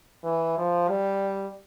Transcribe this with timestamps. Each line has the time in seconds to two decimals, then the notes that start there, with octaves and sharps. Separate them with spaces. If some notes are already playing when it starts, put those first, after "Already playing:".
0.24 E3
0.58 F3
0.89 G3